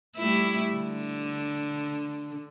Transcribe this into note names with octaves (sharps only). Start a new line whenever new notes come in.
G3 A3 E4
D3